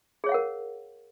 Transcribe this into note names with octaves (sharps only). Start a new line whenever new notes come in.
G#4 A#4 C#5 F5 F#5